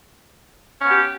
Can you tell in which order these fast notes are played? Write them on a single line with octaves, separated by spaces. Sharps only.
C#4 B3 G4